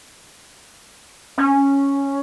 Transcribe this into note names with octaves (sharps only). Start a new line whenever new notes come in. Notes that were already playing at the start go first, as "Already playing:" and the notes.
C#4